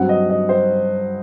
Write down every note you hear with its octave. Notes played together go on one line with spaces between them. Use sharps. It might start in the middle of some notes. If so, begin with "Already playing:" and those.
Already playing: G2 F#3 C4 F#5
D#5
D#5
C5